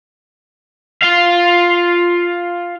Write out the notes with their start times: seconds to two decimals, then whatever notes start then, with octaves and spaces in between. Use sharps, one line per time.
1.02 F4 F5